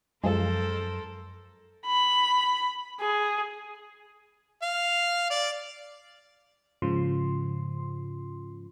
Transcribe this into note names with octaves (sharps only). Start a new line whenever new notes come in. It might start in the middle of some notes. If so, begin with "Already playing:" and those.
F#2 F3 G#3 A4 A#4 C5
B5
G#4
F5
D5
G#2 C#3 F3 C6